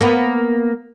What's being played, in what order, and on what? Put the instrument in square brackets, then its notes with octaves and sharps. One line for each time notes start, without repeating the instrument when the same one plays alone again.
[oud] A#3 B3